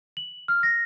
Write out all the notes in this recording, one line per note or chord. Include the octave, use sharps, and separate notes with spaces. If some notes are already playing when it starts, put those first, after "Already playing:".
F#7
F6
A#6